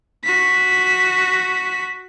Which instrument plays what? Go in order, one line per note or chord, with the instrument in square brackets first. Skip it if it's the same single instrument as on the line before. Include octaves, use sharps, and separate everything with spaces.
[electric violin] F#4 B6